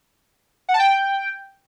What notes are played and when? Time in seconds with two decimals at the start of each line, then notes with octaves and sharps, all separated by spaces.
0.69 F#5
0.74 A5
0.79 G5